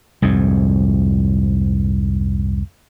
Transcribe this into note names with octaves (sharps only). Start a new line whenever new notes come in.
C2 F2 G#2